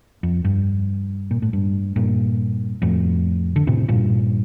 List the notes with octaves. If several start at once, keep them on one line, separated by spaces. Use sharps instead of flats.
F2
G2
A#2
A2
G2
G2 A#2
F2 A2
D3
A2 C3
G2 A#2